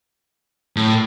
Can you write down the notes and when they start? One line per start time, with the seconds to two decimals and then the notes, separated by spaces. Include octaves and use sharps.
0.76 A2